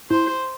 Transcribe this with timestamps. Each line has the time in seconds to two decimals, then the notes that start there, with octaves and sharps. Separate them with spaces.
0.10 E4 C5